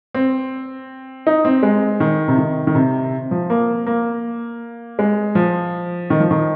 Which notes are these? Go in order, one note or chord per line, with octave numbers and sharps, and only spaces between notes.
C4
D#4
C4
G#3
D#3
C3
D#3
D#3
C3
F3
A#3
A#3
G#3
F3
D#3
F3
D#3